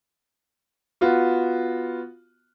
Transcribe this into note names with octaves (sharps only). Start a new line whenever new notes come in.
B3 F4 F#4